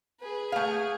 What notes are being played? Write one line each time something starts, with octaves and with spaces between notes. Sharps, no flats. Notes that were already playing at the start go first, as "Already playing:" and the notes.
G#4 B4
A3 G#4 F5